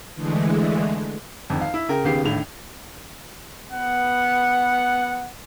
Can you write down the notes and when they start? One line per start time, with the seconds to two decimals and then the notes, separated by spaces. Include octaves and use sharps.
0.15 D3 E3 G#3 A3
1.50 G#1 F2
1.61 F5
1.74 E4
1.88 C#3 A#4 G5
2.04 D#2 C#3 B3 G4 C7
2.24 A#1 D#2 A2 F7
3.71 B3 F#5